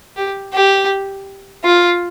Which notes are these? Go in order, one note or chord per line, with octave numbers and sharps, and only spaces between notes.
G4
G4
F4